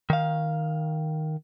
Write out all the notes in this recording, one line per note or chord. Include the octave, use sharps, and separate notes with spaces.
D#3 F5